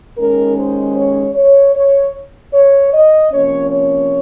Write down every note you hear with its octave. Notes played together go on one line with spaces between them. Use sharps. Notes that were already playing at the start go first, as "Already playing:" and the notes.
D#2 D#3 G#3 C#4 A#4
C5
C#5
C#5
C#5
C#5
D#5
C3 F3 A#3 C#4 C#5
C#5